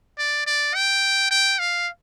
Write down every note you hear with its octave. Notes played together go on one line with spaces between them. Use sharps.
D5
D5
G5
G5
F5